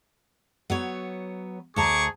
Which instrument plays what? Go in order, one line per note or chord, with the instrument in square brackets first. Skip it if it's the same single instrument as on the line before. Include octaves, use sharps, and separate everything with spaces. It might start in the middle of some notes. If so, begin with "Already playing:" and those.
[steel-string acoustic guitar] F#3 B3 C#5
[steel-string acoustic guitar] D2 A5 A#5 [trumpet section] G#4 C#6 D6